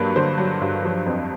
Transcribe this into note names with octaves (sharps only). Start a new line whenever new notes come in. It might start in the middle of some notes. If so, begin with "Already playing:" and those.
Already playing: G2 F#3 A#3 B4
D3 C5
F#3
G2
F3
F2